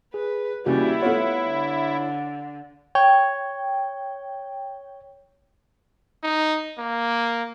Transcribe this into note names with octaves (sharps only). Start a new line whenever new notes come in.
G#4 B4
D#2 C#3 E3 G3 E4 F#4
A3 B3 F4 C#5 F#5
D3
C#5 G5
D#4
A#3